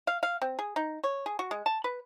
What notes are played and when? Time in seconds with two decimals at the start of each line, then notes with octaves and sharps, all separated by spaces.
0.07 F5
0.23 F5
0.42 C4
0.59 G#4
0.76 D#4
1.04 C#5
1.26 G#4
1.39 F#4
1.51 G#3
1.66 A5
1.84 B4